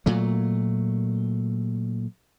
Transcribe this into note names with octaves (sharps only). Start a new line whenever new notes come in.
A#2 F#3 A3